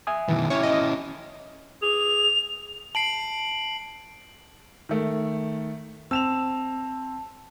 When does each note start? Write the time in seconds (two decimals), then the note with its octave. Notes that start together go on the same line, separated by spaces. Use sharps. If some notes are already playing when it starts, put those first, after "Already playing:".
0.07 E5 G#5 D#6
0.28 B2 D#3 E3
0.50 C#4 E4 C#5
0.63 D#5
1.82 G#4 F7
2.95 A5 C7 D7 F#7
4.89 D#3 A3
6.11 C4 A5 E6 E7 F7